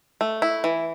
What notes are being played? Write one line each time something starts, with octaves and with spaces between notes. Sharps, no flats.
A3
E4
E3